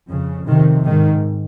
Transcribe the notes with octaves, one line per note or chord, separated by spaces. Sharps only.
F2 C#3
F2 C3 D#3
G#2 D#3